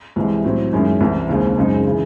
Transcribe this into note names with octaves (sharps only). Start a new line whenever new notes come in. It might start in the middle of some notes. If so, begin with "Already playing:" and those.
C2 C3 E3 G#3
A2 F#3 C4
F#2 D#3 G#3 C#4 E4
C2 C3 E3 C4
D#2 C#3 G#3 C4
F#2 C#3 G#3 C4 D#4
C#3 E3